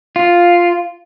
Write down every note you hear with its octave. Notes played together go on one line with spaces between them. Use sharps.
F4